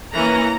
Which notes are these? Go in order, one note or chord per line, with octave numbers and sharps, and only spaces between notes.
E3 A#3 C#4 A#5